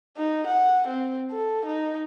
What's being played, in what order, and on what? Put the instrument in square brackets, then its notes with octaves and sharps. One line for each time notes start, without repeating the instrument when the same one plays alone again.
[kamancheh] D#4
F#5
C4
A4
D#4